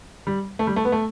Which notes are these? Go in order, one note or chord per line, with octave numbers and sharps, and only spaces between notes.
G3
A3
G3
A3
B3
A3